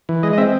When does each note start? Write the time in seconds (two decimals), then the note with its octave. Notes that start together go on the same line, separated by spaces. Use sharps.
0.09 E3
0.23 G#3 D#5
0.33 D#5
0.38 C4 E5